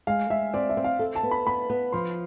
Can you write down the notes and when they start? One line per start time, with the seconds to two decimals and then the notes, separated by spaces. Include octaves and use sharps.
0.07 G#3 F5
0.30 G#3 E5
0.54 C4 D5
0.69 E5
0.77 C4
0.84 F5
0.99 A4
1.15 A5
1.23 B3
1.31 B5
1.47 B3 B5
1.70 B3
1.92 F3 C6